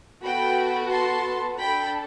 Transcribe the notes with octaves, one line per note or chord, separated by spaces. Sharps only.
B3 F#4 A4 G5 B5
A5 C6
D4 A4 G5 B5